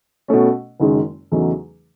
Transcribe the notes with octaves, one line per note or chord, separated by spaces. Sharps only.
B2 A3 C#4
F#1 F#2 D#3 G#3
E2 C#3 F#3 A3 D#4